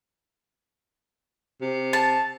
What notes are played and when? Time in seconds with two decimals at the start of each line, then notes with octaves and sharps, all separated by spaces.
1.61 C3
1.93 A5